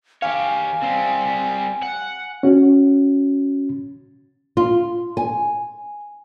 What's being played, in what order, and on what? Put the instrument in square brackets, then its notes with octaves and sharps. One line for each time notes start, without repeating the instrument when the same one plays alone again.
[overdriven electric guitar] G4 C#5 [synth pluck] F5 [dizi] G#5
[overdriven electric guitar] G3 C4
F#5
[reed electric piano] C#4 F#4
[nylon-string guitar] F4
G#5